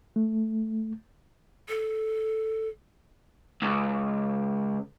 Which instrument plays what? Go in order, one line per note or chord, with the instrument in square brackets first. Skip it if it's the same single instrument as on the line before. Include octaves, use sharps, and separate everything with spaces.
[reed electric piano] A3
[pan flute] A4
[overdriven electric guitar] C#2